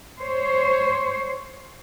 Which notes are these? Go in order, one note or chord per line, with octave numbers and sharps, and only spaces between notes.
C5 C#5